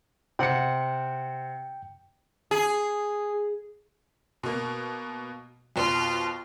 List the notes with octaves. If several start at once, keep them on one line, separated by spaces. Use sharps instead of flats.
C3 F#5 G5 C#7
G#4
B2 A#3
F2 B2 F4